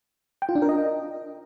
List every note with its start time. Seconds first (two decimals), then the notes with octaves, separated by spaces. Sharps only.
0.42 G5
0.49 F4
0.55 D4
0.62 A#4
0.69 D#5